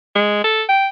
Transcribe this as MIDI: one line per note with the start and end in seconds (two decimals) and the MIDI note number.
0.15 0.40 56
0.44 0.63 69
0.69 0.87 79